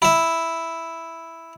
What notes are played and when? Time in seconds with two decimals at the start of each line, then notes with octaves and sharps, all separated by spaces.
0.02 E4 E5